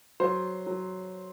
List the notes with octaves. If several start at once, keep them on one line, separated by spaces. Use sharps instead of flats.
F#3 C5
F#3